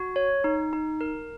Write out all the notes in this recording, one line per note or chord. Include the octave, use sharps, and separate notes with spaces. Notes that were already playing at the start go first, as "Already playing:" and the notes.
Already playing: F#4
C#5
D#4
D#4
A#4